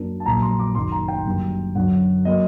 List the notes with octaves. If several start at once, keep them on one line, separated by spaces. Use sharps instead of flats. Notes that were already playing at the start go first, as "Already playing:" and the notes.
Already playing: F#2 F#3 A#3 D4
A5
A#1 A#2 F#3 A#3 A#5
C6
D6
F#1 F#2 D#3 C6
A#5
G5
F#2 D3 G3 A#3
F#2 D3 F#3 F#5
F#3 A#3 D#5